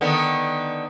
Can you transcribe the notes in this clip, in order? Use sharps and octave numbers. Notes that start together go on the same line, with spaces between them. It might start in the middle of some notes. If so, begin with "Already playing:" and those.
D3 D#3 B3